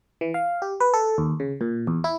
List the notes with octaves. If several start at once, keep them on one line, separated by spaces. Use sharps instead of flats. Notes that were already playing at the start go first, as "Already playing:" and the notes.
E3
F5
G4
B4
A4
D#2
C#3
A#2
E2
E4